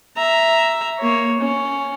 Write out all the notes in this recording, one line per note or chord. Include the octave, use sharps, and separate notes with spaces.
E5 A#5
A#3 C#5
C#4